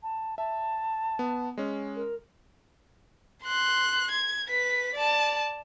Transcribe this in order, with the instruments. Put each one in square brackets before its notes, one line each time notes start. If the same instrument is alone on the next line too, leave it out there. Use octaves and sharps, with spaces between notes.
[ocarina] A5
[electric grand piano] E5 [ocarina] A5
[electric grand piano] B3
G#3 C#4
[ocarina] A#4
[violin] C6 F#6
G#6
B4 B6
D5 A5